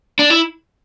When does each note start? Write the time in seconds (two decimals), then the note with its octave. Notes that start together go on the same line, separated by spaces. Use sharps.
0.19 D4
0.30 E4